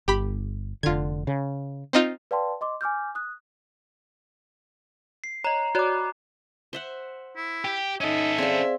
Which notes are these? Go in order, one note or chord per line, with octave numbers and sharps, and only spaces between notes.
G1 G4 B5
F1 D3 F4 G#6
C#3
C4 D#4 F4
B4 D5 F5 G5 A5 C6
D#5 C6 D6
G#5 D6 F6 G6
D#6 F#6
C7
C#5 D#5 A#5
F#4 C#5 D5 D6 F#6
C5 E5 F#5
E4
G4
C#4 D#4 A4 D#5 E5
C4 G#4 C5 D5 F5